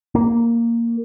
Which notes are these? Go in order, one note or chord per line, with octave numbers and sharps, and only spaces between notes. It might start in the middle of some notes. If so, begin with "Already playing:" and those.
A#3